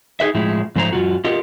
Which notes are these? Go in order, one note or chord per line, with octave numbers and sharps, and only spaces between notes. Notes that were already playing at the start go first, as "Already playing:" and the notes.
D#4 G#4 B4 E5
A2 F3 G#3 E4
G#2 F3 A3 C5 A5 A#5
F#2 C3 F4 F#4
F4 G4 A4 A#4 D#5